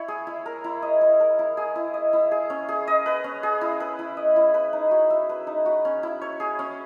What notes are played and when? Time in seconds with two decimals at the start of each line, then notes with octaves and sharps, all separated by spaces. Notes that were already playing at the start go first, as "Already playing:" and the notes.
Already playing: E4 C#5
0.08 G#4
0.27 E4
0.46 A#4
0.64 E4
0.82 D#5
1.01 E4
1.20 A#4
1.39 E4
1.57 G#4
1.75 E4
1.94 D#5
2.13 E4
2.31 G#4
2.50 C#4
2.69 G#4
2.87 D#5
3.06 B4
3.24 C#4
3.43 G#4
3.61 E4
3.80 B4
3.99 E4
4.17 D#5
4.36 E4
4.54 B4
4.73 D#4
4.91 F#4
5.10 E5
5.29 B4
5.47 D#4
5.66 F#4
5.85 C#4
6.03 E4
6.21 C#5
6.40 G#4
6.59 C#4